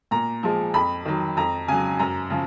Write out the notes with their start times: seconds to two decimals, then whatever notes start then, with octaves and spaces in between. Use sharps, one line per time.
0.11 A#2 A#5
0.43 F3 G#3
0.74 F2 B5
1.05 D#3 F#3
1.37 F2 A#5
1.68 C#3 F#3 G#5
1.99 F#2 A#5
2.30 C#3 F3